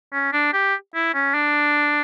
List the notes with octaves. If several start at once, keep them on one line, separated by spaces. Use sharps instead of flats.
C#4
D4
G4
E4
C#4
D4